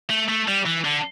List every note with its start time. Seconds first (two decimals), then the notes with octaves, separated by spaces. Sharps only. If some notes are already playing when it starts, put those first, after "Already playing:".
0.10 A3
0.29 A3
0.48 G3
0.66 E3
0.85 D3